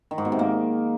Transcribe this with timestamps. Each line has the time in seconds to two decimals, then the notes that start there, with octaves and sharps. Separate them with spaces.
0.11 D#3
0.18 G#2
0.25 B2
0.32 C3
0.39 A#3